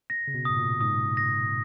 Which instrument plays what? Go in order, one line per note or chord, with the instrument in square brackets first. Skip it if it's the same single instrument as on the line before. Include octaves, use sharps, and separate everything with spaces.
[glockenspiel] A#6
[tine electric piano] C#3
B2
[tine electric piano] G#2 [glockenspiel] D#6
[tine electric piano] A#2
[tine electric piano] G#2 [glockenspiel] D#6
[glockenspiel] A#6